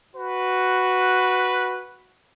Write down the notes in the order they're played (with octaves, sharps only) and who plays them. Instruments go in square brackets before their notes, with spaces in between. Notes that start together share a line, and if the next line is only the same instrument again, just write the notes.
[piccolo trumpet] F#4 [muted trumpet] B4